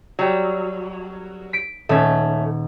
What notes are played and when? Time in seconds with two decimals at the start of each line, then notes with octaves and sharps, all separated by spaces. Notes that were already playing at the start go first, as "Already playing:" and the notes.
0.19 F#3 G3
1.53 B6 D7
1.89 D#1 A3 C#4